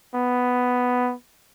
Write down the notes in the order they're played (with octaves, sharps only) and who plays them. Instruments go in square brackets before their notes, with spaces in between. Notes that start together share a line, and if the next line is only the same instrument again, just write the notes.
[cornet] B3